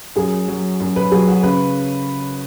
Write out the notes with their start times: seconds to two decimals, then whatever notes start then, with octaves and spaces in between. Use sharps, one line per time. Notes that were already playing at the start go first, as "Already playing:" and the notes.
0.16 F#2 G#4
0.48 F#3
0.80 F#2
0.96 B4
1.11 F#3 G#4
1.28 F#4
1.43 C#3 B4